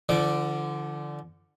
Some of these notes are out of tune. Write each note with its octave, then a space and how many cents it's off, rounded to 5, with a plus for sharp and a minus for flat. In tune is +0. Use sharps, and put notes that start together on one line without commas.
D3 +0 F3 -35 D5 +0